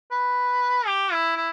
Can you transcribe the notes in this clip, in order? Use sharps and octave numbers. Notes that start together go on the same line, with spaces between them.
B4
G4
E4
E4